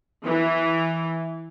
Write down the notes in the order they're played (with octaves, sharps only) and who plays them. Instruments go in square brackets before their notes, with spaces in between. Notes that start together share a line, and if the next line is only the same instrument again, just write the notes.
[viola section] E3